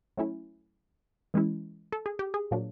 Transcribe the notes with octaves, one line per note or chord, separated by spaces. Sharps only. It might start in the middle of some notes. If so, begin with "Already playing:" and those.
F#3 A3 C#4 E4
E3 G#3 C#4 E4
A4
G#4
G4
G#4
A#2 F#3 A#3 D4